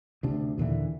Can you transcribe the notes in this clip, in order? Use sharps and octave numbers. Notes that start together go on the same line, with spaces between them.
D2 C3 D4
D#2 A#2 D3 E3